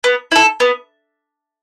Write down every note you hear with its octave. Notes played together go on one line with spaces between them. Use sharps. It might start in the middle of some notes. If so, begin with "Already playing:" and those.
B3
E4 A4
B3